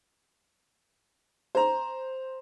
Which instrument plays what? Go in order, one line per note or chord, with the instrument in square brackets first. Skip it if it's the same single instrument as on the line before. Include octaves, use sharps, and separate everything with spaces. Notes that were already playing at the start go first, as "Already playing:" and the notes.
[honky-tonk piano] C5 A#5